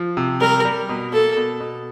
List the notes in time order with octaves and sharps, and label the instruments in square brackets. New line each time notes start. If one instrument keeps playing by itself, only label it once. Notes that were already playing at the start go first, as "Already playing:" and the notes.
Already playing: [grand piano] F3
C3
[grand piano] G3 [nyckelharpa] A#4
[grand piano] G3
B2
[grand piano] A#3 [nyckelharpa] A4
[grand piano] B2
B2